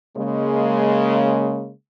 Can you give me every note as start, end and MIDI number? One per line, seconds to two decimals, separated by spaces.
0.17 1.71 49
0.17 1.71 56
0.17 1.71 58